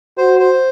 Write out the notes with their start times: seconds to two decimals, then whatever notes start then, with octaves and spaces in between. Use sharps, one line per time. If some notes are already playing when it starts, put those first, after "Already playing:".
0.17 F#4 C5
0.40 C5